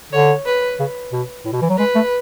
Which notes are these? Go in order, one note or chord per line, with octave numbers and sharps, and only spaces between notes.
D3 C#5
B4
C#3
B2
A2
B2
E3
F#3
G#3 B4
A3